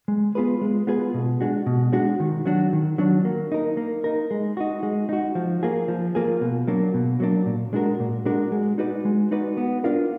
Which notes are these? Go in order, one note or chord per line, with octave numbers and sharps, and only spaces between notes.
G#3
B3 F4 G#4 B4
G#3
B3 F4 G#4 B4
B2
G#3 D4 F#4
B2
G#3 D4 F#4
D#3
F#3 D4 F#4
D#3
F#3 D4 F#4
A#3
D#4 A#4
A#3
D#4 A#4
G#3
D#4 F#4
G#3
D#4 F#4
F3
A#3 F4 G#4
F3
A#3 F4 G#4
B2
F#3 A#3 D4
B2
F#3 A#3 D4
A#2
G#3 D4 F#4 A#4
A#2
G#3 D4 F#4 A#4
G#3
D#4 F#4 B4 D5
G#3
D#4 F#4 B4 D5
B3
D4 F4 A#4 F5